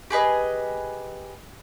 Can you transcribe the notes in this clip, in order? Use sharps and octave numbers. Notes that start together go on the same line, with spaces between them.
G4 G#4 B4 D#5